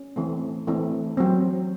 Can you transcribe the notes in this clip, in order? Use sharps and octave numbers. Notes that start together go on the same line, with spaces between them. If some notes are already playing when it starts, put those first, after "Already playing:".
Already playing: C#4
E3 A3 C4
E3 A3 C4
F#3 C4